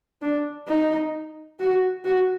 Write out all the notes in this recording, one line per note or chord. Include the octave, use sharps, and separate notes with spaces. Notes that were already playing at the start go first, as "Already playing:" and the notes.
D4
D#4
F#4
F#4